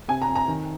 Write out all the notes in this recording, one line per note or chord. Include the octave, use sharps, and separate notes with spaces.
C3 G#5
A#5
F2
A#5
D#3